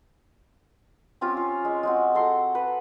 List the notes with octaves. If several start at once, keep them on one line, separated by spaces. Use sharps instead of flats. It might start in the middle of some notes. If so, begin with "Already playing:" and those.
C4 C#4 F4 G4
F4
G#3
G#3 C4 F#4
A4 A#5 C6
B4